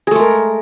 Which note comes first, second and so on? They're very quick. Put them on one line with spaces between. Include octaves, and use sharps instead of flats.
G#4 A3 G#3 A#4